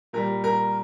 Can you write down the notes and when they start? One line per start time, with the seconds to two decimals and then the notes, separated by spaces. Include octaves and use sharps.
0.13 A#2 G3 A#4
0.44 A#4